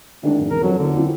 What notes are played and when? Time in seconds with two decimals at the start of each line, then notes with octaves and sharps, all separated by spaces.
0.23 D2 D#3 G#3 D4
0.38 F1 G#2
0.51 E1 A#4
0.63 F2 F#3 F#4 A4 B4
0.78 F#1 D3
0.94 C4 E4 F4